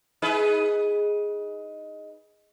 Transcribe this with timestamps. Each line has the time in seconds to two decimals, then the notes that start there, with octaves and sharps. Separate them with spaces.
0.22 D#4 G#4 B4